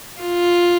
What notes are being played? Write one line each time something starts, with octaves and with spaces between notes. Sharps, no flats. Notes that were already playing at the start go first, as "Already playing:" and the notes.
F4